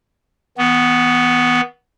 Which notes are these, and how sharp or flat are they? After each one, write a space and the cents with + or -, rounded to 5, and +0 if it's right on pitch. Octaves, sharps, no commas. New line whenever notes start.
E3 -45 B3 +0